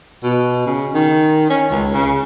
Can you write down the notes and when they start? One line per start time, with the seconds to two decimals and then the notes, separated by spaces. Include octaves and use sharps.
0.23 B2
0.66 C#3
0.94 D#3
1.50 C#4
1.71 C#2
1.94 C#3